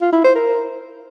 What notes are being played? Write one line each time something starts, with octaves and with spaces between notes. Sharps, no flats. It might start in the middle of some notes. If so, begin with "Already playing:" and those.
F4
E4
C5
A#4